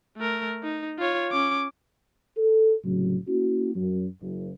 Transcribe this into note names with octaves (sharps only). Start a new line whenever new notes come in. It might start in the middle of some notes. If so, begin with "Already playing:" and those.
A3 A#4
D#4
F4 C#5
C#4 D6
A4
C2 A2 C#3 F#3
A#3 C#4 E4 F#4
F#2
F#1